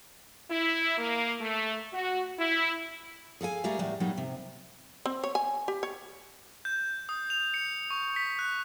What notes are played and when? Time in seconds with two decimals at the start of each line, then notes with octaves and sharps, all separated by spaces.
0.50 E4
0.98 A#3
1.41 A3
1.94 F#4
2.39 E4
3.41 G#4 A4 F5 G#5
3.64 G3 A3 G4 G#4 A#4 F5
3.79 E2 A2 G3
4.00 A#2 F#3 G3 D#4
4.18 C3
5.06 C4
5.24 C#5
5.35 G#5
5.68 G4
5.83 C#5
6.65 G6
7.09 D#6
7.30 F7
7.54 C#7
7.90 C#6
8.16 B6
8.39 F#6